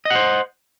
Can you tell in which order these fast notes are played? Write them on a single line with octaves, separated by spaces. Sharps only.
D#5 F#5 C5